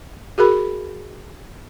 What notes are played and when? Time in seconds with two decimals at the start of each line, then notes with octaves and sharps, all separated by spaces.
0.38 F#4 G#4 A#4 B5